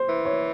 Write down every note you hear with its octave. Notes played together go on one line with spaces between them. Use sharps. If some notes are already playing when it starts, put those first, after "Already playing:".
Already playing: C5
E3
C#5